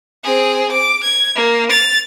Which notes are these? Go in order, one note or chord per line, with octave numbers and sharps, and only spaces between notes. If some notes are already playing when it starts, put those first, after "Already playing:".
C4 G#4
D6
G#6
A#3
A6 F7